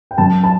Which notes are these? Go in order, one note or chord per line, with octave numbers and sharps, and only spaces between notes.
G5
F#2 A5
A5